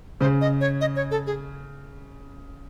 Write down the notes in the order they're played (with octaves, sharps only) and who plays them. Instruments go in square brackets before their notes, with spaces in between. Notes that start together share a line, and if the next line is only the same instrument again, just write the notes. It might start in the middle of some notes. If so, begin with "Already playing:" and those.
[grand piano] C#3 [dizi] C5
[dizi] D#5
C#5
D#5
C#5
A4
G#4